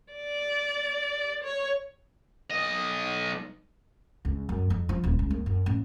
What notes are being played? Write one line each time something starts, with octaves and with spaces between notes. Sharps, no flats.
D5
C#5
B1 D#5
C#2
F#2
F2
F3
D#1
C#2
D#2
F#2
A1